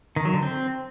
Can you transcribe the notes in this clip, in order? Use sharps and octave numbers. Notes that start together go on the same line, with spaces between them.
D#3
F#3
D3
C4